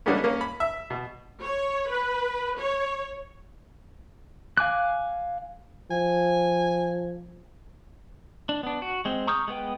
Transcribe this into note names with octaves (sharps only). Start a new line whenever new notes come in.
D3 G3 G#3 A#3 B3 C#4
A#3 C#4
B5
E5
B2
C#5
B4
C#5
F5 G#5 D6 F#6
F3 G#5
D4
B3 D4
F#4
G#3 C4
A#5 C#6 D#6 F6 G6
G#3 B3 B4 G5